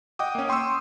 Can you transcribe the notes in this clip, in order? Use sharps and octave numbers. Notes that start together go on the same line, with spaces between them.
D#5 F#5 G5 D6 D#6
A#3 C#4
G5 C6 C#6 D#6 E6